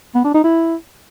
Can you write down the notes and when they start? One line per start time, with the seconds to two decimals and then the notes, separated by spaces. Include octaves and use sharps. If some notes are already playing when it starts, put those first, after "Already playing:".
0.15 B3
0.24 D4
0.34 D#4
0.44 E4